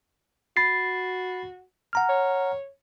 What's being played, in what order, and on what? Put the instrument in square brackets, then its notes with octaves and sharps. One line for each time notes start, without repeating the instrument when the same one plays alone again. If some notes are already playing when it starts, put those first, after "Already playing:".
[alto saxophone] F#4 [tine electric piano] B5 A6 C7
[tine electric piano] F#5 A#5 F6
[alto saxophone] C#5